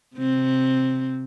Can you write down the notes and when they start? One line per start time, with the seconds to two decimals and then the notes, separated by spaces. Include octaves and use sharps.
0.16 C3 C4